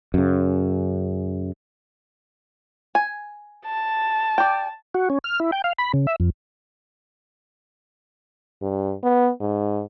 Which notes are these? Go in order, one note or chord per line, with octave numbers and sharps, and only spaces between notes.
F#2 C#3
G#5
A5
D5 G5
F#4
C#4
F6
E4
G5
F5
B5
C#3
E5
F2
G2
B3
G#2